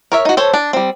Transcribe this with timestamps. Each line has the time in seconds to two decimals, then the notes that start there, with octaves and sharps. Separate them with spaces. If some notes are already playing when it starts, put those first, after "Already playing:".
0.12 A#4 C#5 E5
0.25 D#4 F#4
0.37 A4 C5 C#5
0.53 D4
0.73 G3 C4